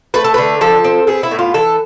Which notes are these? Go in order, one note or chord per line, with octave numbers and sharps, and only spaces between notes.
A3 B4
A4
D3 B4
F3 A4
C4
B3 G#4
E4
A2
F4
E3 A4